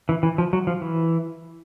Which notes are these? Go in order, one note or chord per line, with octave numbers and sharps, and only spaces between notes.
E3
E3
F3
F#3
F3
E3